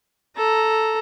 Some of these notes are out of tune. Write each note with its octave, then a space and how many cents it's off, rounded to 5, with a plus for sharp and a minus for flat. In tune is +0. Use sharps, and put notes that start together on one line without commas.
A4 +0 A#5 +0